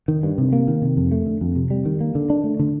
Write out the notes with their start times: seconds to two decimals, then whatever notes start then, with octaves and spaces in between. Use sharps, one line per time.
0.08 D#3
0.23 G2
0.38 C3
0.53 A#3
0.68 D#3
0.82 C3
0.97 F2
1.12 A3
1.26 D3
1.41 F2
1.55 C3
1.71 G3
1.85 D#3
2.01 A#3
2.15 D3
2.30 D4
2.44 A3
2.59 D3